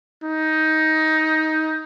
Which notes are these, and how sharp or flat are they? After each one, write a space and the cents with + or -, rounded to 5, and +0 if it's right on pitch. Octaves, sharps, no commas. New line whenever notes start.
D#4 +15